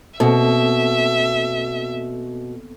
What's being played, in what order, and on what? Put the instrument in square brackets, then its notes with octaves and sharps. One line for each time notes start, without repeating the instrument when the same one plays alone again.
[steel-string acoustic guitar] B2 [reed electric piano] A#3 C4 A4 [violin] E5